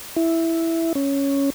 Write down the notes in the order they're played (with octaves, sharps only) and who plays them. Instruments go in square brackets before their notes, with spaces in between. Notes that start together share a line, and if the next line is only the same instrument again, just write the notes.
[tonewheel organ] E4
C#4